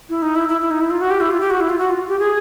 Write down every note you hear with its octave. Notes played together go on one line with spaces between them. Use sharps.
E4
D#4
E4
E4
E4
D#4
E4
F4
F#4
G4
E4
F4
G4
F#4
E4
F4
F#4
F4
G4
G#4